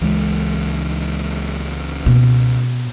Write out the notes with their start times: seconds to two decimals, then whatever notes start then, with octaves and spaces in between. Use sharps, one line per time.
0.01 C#2 E3 G#3
2.06 B2